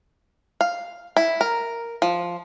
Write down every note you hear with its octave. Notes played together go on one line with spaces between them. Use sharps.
F5
E4
A#4
F3